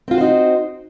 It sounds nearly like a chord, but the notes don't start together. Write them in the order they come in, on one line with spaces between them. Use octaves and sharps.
C4 F4 F#4 C5 D#4